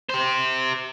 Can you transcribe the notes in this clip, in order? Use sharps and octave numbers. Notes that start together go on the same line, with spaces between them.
G4 C5